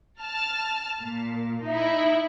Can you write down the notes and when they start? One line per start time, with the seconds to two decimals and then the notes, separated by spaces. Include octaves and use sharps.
0.21 A5 F6
1.00 A#2
1.66 D#4 E4 E5